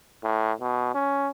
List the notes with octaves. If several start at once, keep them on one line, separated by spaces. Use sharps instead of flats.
A2
B2
C#4